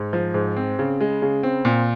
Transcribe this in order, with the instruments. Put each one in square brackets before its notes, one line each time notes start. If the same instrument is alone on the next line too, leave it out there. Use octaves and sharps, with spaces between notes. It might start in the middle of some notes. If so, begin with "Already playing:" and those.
Already playing: [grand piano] G#2
F3
G#2
C4
C#3
G#3
C#3
C4
A#2